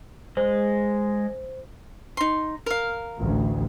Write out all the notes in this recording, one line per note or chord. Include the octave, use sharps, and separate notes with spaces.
G#3 C5
D#4 C6
A#4 F5
A1 D2